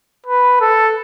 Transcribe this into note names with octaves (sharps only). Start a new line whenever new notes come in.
B4
A4